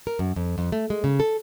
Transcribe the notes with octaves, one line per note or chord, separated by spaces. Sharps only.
A#4
F#2
F2
F2
A3
G#3
C#3
A4